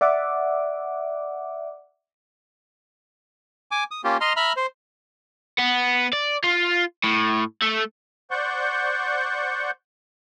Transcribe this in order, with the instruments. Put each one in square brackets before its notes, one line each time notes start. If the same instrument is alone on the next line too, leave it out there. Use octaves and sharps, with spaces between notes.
[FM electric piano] D5 E5 F#5 D6
[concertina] G#5 D6
D#6
A#3 C#4 F4 G4
D#5 A#5 C6 F6
E5 A#5 B5 F6
C5
[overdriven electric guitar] B3
D5
F4
A2
A3
[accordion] C5 D5 F#5 C#6 G6